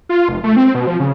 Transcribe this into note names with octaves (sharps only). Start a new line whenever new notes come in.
F4
F1
A3
C4
B2
F3
C#3